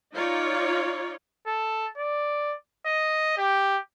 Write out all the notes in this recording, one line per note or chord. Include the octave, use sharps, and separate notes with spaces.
D#4 F4 C#5 D5
A4
D5
D#5
G4